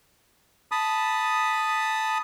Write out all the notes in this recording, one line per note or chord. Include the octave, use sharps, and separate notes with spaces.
A5 B5 D#6